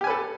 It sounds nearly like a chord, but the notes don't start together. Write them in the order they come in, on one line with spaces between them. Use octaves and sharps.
G4 G#5 B4 A4